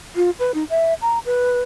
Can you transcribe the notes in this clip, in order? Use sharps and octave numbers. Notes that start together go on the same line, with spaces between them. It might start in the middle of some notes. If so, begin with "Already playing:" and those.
F4
B4
D#4
E5
A#5
B4